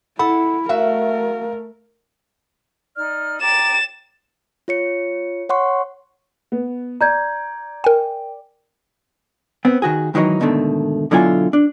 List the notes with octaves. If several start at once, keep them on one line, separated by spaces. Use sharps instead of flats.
E4 A4 F#5 B5
A3 F#4 A#4 E5 F5
D#4 D5 F6
G5 A#5 D6 A6 E7
F4 C#5 C#7
C#5 F#5 C6 C#6
B3
D5 A#5 G6 G#6
A#4 G5 G#5
B3 C4
D#3 F#4 G#4
G#2 D#3 E3 F#3 D#4
G#2 B2 D3 D#3 A3
B2 D3 F#3 E4 F4 G#5
D4